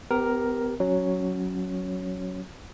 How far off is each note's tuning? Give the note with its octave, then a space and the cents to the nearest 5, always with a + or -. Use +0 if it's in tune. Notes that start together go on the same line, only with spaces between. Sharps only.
B3 +40 G4 +0 A#4 +5
F#3 +0 C#4 +0 C#5 +0